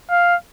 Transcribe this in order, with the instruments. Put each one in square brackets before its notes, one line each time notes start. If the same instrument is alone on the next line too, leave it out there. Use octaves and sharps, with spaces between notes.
[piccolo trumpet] F5